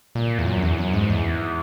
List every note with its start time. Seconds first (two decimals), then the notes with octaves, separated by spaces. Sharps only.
0.15 A#2
0.39 E2
0.46 F#2
0.63 E2
0.78 F#2
0.93 G#2
1.10 E2